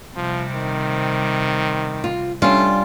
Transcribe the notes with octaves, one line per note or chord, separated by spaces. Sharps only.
C3 F3 G3 C4
D#3
F4
G3 A3 C#4 D4 F4